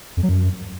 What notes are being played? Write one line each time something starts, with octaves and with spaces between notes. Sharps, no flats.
F2
F#3
F#2